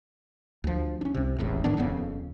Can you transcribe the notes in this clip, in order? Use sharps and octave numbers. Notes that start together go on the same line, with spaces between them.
D2 F3
C#4 D4
C2 C3
E1 A1 E2 A2
G#2 D#3 B3 D4
D#1 F2 C#3 B3